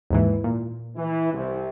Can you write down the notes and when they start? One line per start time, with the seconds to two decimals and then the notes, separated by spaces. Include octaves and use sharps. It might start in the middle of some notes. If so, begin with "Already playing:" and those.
0.10 D#2 G#2 E3
0.44 A#2
0.96 E3 E4
1.33 C2 C3